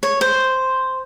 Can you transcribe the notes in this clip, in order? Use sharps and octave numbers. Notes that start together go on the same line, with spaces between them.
C#5
C5